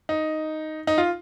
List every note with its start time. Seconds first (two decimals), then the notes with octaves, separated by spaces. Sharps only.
0.09 D#4
0.87 D#4
0.98 F4